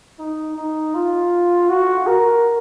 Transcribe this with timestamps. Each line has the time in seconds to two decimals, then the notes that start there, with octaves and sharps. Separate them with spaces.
0.19 D#4
0.56 D#4
0.95 F4
1.69 F#4
2.07 A#4